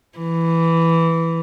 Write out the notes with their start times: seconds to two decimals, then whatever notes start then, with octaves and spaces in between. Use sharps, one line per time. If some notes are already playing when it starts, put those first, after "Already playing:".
0.18 E3